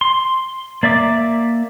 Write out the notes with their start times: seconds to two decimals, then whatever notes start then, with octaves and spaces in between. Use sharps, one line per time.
0.01 C6
0.83 A#3 D5 E5 D6